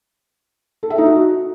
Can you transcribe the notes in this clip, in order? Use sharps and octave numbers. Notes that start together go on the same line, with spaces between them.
A4
E5
D#4
F#4